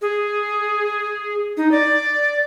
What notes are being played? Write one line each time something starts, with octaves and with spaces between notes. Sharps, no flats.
G#4
D#4
D5